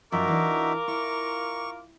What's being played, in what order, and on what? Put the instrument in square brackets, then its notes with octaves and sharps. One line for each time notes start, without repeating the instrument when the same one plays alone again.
[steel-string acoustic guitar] F#2 F3 [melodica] D#4 F#4 E5 [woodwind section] F4 A#4 D6
[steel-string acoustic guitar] E3 D4
[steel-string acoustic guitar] E4 [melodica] C#6